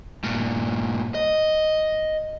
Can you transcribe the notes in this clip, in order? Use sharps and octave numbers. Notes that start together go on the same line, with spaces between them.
G2 A#2
D#5